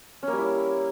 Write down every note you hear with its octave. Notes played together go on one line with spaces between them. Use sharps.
C#4
A#3
G3
E4